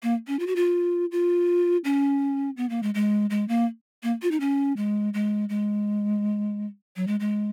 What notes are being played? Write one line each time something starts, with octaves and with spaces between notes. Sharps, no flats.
A#3
C#4
F4
F#4
F4
F4
C#4
B3
A#3
G#3
G#3
G#3
A#3
A#3
F4
D#4
C#4
G#3
G#3
G#3
F#3
G#3
G#3